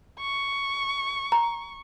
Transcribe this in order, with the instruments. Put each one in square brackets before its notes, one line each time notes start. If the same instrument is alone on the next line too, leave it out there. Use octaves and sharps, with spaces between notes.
[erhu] C#6
[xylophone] A#5